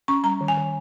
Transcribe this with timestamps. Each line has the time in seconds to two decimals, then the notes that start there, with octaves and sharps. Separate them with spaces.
0.08 C#4 C#6
0.24 G3 A#5
0.41 D#3
0.48 G#5
0.57 D#3